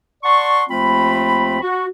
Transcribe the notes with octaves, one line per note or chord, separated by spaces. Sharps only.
D5 F#5 A5 C6 C#6
D#2 F3 A3 C4 F4 B5
F#4